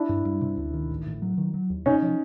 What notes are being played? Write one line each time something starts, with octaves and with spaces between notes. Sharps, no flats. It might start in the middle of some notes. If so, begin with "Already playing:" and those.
Already playing: D4 E4
G2
G2
C3
D2
D#3
A1
A2
F#3
D#3
F#3
D#2
C3 C#4 D#4
F3